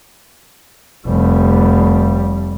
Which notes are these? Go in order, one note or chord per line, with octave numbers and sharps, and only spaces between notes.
F1 G3